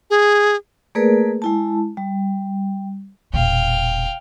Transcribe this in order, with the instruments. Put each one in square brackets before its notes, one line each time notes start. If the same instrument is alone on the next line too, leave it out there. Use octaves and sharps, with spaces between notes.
[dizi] G#4
[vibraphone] A3 A#3 G#4 A#4 B4 D5
G#3 E4 A5
G3
[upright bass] E1 A#2 [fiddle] F5 G5